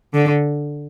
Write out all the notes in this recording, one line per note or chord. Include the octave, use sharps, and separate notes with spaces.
D3